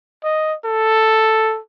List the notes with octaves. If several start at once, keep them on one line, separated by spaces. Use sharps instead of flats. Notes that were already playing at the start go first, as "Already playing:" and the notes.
D#5
A4